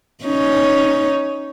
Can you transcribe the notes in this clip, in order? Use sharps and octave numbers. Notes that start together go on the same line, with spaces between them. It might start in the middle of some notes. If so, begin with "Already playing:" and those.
C#4 D#4 C#5